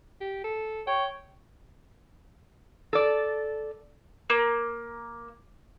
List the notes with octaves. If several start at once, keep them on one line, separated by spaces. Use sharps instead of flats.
G4
A4
C#5 G5
A4 D5
A#3